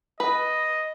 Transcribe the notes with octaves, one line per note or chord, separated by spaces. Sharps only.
B4 D#5